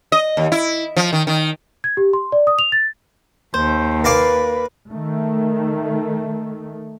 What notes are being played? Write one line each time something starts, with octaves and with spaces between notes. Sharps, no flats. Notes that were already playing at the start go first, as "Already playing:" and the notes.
D#5
D#2
E4
F3
D#3
D#3
G#6
G4
C6
D5
D#6
F7
A6
D#2 C5
A#3 B4 D5 F5
D#3 A3